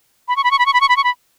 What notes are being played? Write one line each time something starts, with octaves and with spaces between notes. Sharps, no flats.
B5
C#6
B5
C#6
B5
C#6
B5
C#6
B5
C#6
B5